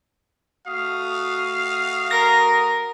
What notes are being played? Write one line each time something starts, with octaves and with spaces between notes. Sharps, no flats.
A3 F#4 F5 D#6
A#4 A#6